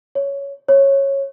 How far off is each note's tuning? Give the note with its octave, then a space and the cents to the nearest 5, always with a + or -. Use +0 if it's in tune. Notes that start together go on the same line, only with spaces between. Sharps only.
C#5 +10
C#5 -15